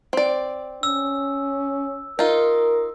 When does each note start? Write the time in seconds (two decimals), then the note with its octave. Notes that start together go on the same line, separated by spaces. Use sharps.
0.13 C4 D5
0.83 C#4 E6
2.19 D#4 F4 A#4